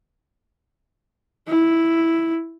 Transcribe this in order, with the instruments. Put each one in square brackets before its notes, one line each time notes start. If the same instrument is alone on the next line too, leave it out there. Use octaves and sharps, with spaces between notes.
[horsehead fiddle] E4